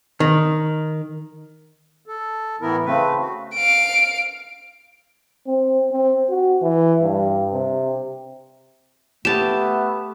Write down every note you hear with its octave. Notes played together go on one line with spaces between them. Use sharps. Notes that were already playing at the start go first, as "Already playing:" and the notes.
D#3
A4
A2 E3 B3 E4 A#4
C#3 A3 C4 B4
F#4
F5 D7
C4
C4
F#4
E3
G2
C3
A3 B3 G4 A5 E7